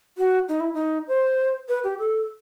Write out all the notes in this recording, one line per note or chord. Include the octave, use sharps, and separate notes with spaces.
F#4
D#4
E4
D#4
C5
B4
G4
A4